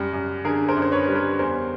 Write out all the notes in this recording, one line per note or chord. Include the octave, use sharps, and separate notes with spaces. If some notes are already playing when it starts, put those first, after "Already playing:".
Already playing: F#2 G3 G4
F#2
D3 G#4 A#4
A#4 C5
F#2
C5
B4 C#5
G3
A#4 C5
E2 A#4 C5